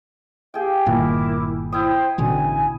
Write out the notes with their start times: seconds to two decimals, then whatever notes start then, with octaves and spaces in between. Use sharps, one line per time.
0.54 G4 G#4 F5 G5
0.86 G1 A#2 D#3 E4 A#4 D6
1.72 E4 C5 G5 D#6
2.18 A1 B2 D3 G#5